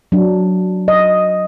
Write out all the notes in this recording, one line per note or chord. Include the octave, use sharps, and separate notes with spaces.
F#3 D4
D#5